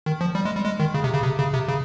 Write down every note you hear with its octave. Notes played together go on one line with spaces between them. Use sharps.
D#3
F3
G3
G#3
G3
G#3
D#3
C#3
C3
C#3
C3
C#3
C3
C#3